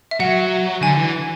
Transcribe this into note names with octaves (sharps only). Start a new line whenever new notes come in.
E5
F#3 F#5
D3 G#5
E3